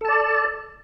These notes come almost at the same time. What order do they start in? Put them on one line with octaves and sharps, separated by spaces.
A4 A5 D5